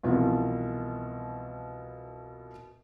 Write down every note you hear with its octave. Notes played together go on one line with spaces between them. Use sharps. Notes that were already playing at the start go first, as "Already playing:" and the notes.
C2 B2 E3 F3